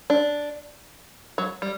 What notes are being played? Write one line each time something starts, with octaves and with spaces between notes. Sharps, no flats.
D4
F#3
G3